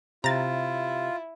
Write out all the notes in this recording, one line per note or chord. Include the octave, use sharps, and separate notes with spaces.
C3 E4 F4 A#5 A6